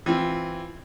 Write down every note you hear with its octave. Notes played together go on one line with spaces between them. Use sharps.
E3 C4 F4